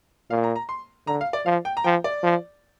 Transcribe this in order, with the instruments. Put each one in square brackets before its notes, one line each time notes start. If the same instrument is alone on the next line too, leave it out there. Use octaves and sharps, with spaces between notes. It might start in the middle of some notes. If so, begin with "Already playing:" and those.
[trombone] A#2 [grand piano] F5
[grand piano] A#5
A#5
C6
[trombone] D3 [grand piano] A#5
[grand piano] F5
D5
[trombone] F3 [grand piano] F5
[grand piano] G5
A#5
[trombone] F3 [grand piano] G5
[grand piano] D5
[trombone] F3